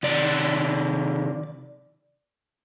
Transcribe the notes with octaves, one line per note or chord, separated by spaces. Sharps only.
C3 D#3 D5